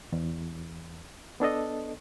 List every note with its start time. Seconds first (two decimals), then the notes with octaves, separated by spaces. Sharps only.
0.12 E2
1.40 B3 D4 A4 D#5